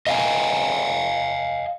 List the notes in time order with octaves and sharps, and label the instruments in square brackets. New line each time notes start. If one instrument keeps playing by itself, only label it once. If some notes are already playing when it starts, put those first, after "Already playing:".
[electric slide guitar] D#5 F5 G5 G#5